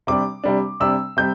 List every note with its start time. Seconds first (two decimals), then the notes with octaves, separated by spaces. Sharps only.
0.07 C3 G3 D4 D6
0.44 C3 G3 D4
0.80 C3 G3 D4 E6
1.17 C3 G3 G6